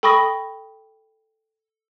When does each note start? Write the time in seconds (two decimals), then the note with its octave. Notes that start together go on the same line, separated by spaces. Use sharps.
0.03 A4 G5 B5 C#6 D#6 A#6